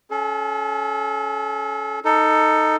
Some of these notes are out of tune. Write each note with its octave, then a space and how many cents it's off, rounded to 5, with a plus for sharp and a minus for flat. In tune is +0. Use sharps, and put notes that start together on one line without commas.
C#4 +0 A4 -35
D#4 +0 A4 +15